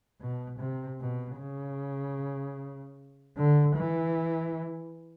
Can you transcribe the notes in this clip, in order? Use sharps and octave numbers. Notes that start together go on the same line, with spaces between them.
B2
C3
B2
C#3
D3
E3